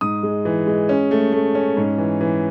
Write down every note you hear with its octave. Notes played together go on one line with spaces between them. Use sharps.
G#2 D#6
G#3
E3
G#3
C#4
A3
A3
C#4
G#2
E3
E3